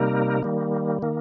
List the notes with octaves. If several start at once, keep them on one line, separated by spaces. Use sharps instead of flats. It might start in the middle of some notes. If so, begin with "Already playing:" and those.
Already playing: C3 G3 A#3 D#4 A#4
D#3 G3 A#3
D#3 A#3